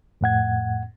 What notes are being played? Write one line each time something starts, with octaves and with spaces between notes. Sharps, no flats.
F2 A2 F#5 G#6